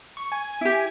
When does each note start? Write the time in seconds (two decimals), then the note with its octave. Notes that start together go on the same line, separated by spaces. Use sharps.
0.17 C#6
0.32 G#5
0.61 E4 G4